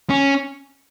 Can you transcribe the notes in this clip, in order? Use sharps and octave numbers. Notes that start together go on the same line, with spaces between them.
C#4